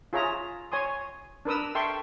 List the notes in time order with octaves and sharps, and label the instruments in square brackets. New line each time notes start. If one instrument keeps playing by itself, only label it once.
[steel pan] F4 G#4 C#5 E5 A#5
C#5 G#5 C6 D#6
D4 A#4 B4 D#6 E6
A4 E5 G5 C6 C#6